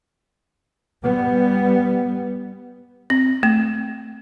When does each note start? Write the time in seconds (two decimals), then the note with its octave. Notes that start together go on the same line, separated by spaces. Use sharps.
1.03 G3 B3
3.10 C4
3.43 A3